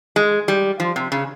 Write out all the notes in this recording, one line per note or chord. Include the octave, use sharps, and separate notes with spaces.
G#3
G3
F3
C3
C#3